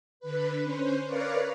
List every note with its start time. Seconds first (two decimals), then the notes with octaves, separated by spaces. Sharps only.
0.20 D3 B4
0.64 C#4 C5
1.05 A#4 B4 C#5 D5 F5